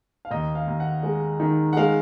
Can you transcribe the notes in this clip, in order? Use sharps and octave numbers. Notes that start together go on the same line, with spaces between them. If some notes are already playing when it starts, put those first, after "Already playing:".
F5
D#2 D#5
F5
D#2
F#5
G#3
D#3
F#5
G#3 F5